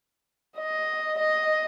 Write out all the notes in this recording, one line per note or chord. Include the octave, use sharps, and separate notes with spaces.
D#5
D#5